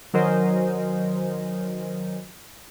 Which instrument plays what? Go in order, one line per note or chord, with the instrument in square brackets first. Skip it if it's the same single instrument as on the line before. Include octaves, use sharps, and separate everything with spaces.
[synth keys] D#3 F#3 A#4 C5 D#5 G#5